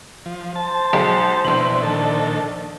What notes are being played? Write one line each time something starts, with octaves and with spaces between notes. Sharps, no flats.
F3
C5 A5
B1 G#3
A#1 B2 E3 F#7
A#2 D#3 D4 A4